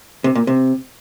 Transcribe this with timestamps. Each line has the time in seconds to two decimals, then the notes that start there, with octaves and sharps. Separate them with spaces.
0.24 C3
0.35 A#2
0.47 C3